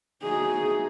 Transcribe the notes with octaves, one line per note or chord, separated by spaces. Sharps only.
B2 F#3 A3 D#4 F#4 G#4